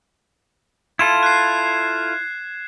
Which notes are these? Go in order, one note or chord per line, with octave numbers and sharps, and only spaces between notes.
E4 F4 A4 G#6 E7
F#6 C7